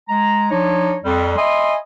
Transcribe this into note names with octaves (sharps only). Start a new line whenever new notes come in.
G#3 A#5
F3 D4 D#4 C#5
F2 G3
D#5 E5 G#5 B5 C6